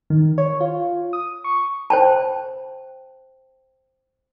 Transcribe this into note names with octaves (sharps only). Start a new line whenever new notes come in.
D#3
C#5
F4
D#6
C#6
C5 G5 A5